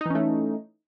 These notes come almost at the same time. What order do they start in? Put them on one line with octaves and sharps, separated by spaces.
D#4 E3 C#4 A3